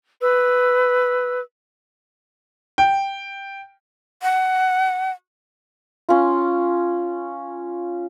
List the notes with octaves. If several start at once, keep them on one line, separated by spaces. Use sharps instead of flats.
B4 E6
G5
F#5
C#4 F4